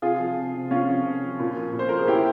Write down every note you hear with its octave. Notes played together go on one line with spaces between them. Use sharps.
C3 F4 G#4
F3
C3
C3
C3 C#4 F4
F3
C3
F3
A#2
F3
A#2
C5
F3 A#4
G#4
F3 E4 G4